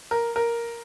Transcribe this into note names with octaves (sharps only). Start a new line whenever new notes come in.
A#4
A#4